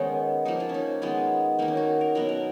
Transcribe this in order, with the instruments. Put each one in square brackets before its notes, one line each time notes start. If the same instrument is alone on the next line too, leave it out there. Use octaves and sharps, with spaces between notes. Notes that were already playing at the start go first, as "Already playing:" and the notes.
Already playing: [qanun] D#3 G#3 B3 C#4 D#4
F3 A#3 D#4
F4
C#4
D#4
D#3 G#3 B3 F4
D#3 A#3 D#4
C#4
F#4
A#4
B2 F#3 B3 A#4
A#4